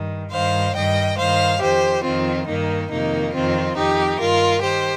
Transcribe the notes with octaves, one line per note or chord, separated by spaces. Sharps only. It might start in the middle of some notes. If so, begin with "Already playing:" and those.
Already playing: G2 D#3
G2 D#3 C5 F5
G2 D#3 D#5 G5
G2 D#3 C5 F5
F2 D#3 G4 C5
F2 D#3 C4 F4
G2 D#3 A#3 D#4
F2 C3 D#3 A#3 D#4
F2 D#3 C4 F4
F2 D#3 D#4 G4
G2 D#3 F4 A#4
D#3 G4 C5